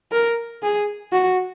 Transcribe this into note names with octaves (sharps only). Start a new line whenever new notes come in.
A#4
G#4
F#4